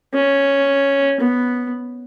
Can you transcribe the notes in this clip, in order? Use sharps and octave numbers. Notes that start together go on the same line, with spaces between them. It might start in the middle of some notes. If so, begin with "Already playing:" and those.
C#4
B3